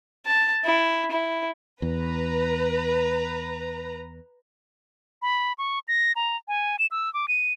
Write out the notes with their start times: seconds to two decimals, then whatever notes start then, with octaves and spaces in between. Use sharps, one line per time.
0.26 A5
0.65 E4
1.11 E4
1.82 E2 B4 A#5
5.22 B5
5.58 C#6
5.88 A#6
6.16 A#5
6.48 G#5
6.79 E7
6.91 E6
7.14 D6
7.28 D#7